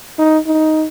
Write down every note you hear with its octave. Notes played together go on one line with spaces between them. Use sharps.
D#4
D#4